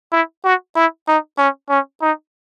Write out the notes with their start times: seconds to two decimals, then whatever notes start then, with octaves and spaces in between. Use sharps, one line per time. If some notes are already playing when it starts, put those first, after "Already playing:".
0.12 E4
0.45 F#4
0.76 E4
1.08 D#4
1.38 C#4
1.70 C#4
2.02 D#4